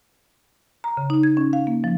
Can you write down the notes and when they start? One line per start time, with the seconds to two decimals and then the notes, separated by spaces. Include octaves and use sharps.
0.84 A#5
0.97 C#3
1.10 D#4
1.23 G#6
1.37 C#4
1.53 F5
1.67 A#3
1.84 F3